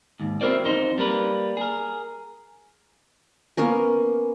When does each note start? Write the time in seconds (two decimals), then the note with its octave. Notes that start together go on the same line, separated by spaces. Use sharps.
0.20 D#2 G#2
0.41 C4 E4 F#4 A#4 C5 D5
0.65 F2 D#4 C5
0.98 G3 A#3 A#4 B4
1.57 G#4 A#4
3.57 A#3 B3 C#4 A#4